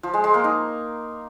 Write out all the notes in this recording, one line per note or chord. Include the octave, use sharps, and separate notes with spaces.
F3
G#3
G#3
A#3
D#4